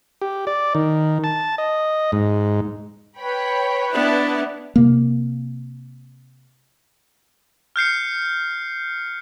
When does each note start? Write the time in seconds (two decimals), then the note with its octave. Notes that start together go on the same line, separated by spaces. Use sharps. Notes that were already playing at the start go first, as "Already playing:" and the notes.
0.22 G4
0.47 D5
0.75 D#3
1.24 A5
1.58 D#5
2.12 G#2
3.19 B4 C#5 G5 B5
3.94 B3 D4 E4 A5
4.76 C3 A#3
7.76 F6 G6 C7 C#7